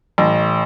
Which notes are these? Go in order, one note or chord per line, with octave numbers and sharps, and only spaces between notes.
A1